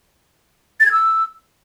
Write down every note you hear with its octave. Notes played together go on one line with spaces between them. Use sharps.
A6
G#6
E6